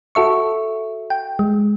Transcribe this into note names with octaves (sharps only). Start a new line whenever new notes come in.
F#4 A4 E5 C#6
G5
G#3